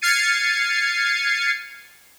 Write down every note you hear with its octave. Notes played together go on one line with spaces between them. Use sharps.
F6 G#6 A6 C7 C#7 D#7